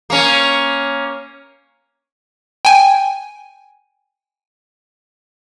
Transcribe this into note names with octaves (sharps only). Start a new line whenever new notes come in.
A#3 C#4
G5 G#5